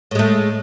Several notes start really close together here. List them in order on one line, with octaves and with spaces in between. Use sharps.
A2 G#3 A3